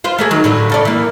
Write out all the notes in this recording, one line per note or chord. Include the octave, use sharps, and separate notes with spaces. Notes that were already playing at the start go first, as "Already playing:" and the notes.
F4 B4 C5
A3 A#3 G#4
D#3 F#3
A2 D3 F#3
C#3 A4 D5
E3 A#3